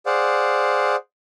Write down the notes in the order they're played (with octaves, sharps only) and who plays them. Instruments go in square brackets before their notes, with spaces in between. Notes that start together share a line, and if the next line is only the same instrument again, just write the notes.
[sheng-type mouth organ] G#4 C5 D5 F5 F#5